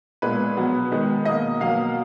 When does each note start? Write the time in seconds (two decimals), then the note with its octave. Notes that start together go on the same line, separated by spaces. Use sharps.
0.22 A#2 G#3 B3 B4
0.57 B2 F#3 B3
0.91 D#3 G#3 B3
1.25 B2 A#3 D#5
1.60 B2 F#3 A#3 F5